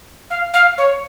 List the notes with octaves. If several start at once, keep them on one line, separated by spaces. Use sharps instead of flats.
F5
F5
C#5